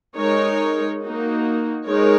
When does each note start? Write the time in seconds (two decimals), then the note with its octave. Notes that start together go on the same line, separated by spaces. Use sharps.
0.16 G#3 D#4 A#4 C#5
1.02 A#3 D#4 F#4
1.87 G#3 D#4 A#4 C#5